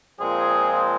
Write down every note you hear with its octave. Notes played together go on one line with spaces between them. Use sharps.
A#2 F3 G#3 C4 G#4